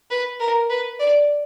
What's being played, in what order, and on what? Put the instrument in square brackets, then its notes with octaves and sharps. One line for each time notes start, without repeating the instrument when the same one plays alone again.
[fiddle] B4
A#4
B4
D5